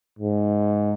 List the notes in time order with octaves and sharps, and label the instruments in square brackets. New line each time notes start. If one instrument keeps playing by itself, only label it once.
[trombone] G#2